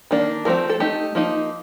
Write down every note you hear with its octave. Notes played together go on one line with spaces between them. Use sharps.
D#3 A#3 D4
F3 A3 C4 A#4
A4
A3 D#4 G4
F3 A#3 D#4